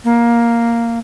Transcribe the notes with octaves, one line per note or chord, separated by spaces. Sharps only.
A#3